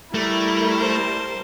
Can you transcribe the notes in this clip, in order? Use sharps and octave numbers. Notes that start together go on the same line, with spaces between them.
G3 A3 E4 A#4
C5 A5